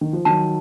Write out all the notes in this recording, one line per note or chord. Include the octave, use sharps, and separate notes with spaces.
D#3
F3
D#3 F#3 A5